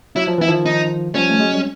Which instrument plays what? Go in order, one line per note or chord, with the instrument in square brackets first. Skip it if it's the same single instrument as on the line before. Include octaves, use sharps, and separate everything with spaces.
[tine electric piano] F#3 [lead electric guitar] E4
[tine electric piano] F3
[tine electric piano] E3 [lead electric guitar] E4
[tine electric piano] D#3 F3
[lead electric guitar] D#4
[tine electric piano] F3 G3 [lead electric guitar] C#4
[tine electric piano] A3
F#3 G#3
G3